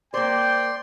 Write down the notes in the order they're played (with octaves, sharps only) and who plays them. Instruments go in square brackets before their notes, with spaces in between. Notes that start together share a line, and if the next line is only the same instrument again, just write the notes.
[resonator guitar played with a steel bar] A#3 C5 [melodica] D5 C6 [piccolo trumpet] G5